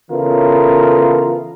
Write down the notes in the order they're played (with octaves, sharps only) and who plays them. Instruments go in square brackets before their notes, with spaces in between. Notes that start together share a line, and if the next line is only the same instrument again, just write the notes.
[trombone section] C#3 E3 B3 F4 A4 A#4